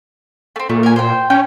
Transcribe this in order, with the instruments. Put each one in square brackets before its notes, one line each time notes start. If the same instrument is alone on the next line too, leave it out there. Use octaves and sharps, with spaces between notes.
[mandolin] A3 C4
[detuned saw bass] A#2 [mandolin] A3
[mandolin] A#4 G#5
C5 G5
[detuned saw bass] C#4 [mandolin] G5